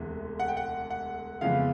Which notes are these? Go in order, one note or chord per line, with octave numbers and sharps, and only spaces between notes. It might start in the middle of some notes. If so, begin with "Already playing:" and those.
Already playing: E1 D2 C3 E3 G#3
F#5
G5
F#5
F#5
F2 C#3 E3 G#3 B3 F5